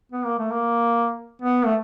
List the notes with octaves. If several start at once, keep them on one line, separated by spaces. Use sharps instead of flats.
B3
A#3
A3
A#3
B3
A3